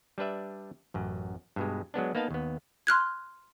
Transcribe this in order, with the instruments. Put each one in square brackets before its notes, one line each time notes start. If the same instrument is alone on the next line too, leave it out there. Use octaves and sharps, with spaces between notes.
[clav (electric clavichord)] G3 D4 B4 E5
A1 F#2
G2 B2 G#3
F#3 G#3 B3 D4
A#3 B3 D#4 B4 F5 A5
D#2 B3
[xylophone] C6 F6 F#6 G#6